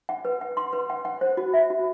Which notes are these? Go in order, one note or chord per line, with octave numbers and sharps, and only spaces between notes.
F#5
B4
F#5
C6
B4
F#5
F#5
C5
F#4
E5
F#4